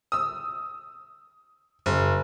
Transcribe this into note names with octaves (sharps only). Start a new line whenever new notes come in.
D#6 E6
F#1